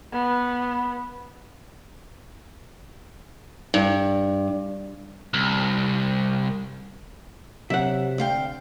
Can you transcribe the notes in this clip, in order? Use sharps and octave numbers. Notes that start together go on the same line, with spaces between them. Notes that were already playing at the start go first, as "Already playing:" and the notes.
B3
G2
C2
C3 F#3 E5 F#5
D2 F5 G5